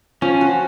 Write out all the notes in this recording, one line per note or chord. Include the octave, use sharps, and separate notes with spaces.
F3 C#4
F#4